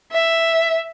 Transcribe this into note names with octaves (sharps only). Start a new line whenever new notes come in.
E5